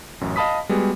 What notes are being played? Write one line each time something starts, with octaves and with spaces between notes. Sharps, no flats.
A1 F#2
D#5 F5 A5 B5 D#6 B6
G3 G#3 B3 F#4 G#4